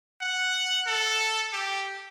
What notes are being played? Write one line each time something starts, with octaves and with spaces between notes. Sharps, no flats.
F#5
A4
G4